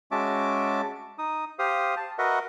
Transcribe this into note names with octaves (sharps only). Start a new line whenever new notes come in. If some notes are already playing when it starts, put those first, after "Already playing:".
G#3 C#4 F#4 E5 A5 D6
D#4 D#6
G4 C5 F5 D#6
A5
F#4 A#4 B4 D#5 E5 F#5